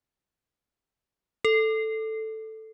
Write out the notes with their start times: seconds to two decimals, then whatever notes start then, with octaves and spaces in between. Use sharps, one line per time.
1.45 A4